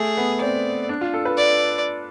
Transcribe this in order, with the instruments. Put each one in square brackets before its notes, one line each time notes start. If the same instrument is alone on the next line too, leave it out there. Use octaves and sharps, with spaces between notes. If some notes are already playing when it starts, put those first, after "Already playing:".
Already playing: [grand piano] A3 [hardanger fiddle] G#4
[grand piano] B3
[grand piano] C4 [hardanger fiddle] D5
[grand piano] D4
F4
A4
B4
[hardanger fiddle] D5